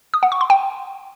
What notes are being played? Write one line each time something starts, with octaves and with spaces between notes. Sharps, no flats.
D#6
F#5
C#6
C6
G5